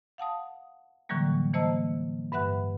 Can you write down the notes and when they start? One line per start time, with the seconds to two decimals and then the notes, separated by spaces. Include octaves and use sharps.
0.18 F5 F#5 A5 D#6
1.09 A2 D3 E3 F#3 G3 A#3
1.54 E3 A#3 C5 D#5 A5 E6
2.32 G2 B4 E5 F#5 F#6